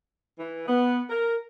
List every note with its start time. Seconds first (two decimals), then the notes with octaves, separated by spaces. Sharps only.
0.38 E3
0.68 B3
1.10 A#4